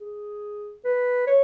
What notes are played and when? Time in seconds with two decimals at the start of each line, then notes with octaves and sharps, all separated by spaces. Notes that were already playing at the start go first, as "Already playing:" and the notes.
0.01 G#4
0.85 B4
1.27 C#5